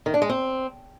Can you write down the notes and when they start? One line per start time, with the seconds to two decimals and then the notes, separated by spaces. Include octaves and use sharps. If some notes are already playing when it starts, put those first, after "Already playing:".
0.06 D#3
0.14 D4
0.22 G#3
0.29 C4